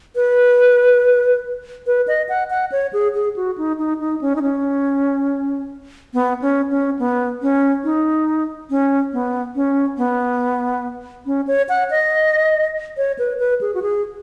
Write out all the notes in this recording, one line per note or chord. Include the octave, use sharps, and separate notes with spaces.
B4
B4
D#5
F#5
F#5
C#5
G#4
G#4
F#4
D#4
D#4
D#4
C#4
D#4
C#4
B3
C#4
C#4
B3
C#4
D#4
C#4
B3
C#4
B3
C#4
C#5
F#5
D#5
C#5
B4
B4
G#4
F#4
G#4